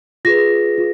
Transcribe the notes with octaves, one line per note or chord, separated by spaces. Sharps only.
F4 G#4 B4 A#6
F4